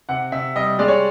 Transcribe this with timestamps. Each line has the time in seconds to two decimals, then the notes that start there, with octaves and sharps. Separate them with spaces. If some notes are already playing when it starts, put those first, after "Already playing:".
0.09 C3 F#5
0.32 C3 E5
0.55 G3 D#5
0.79 G#3 D5
0.88 C#5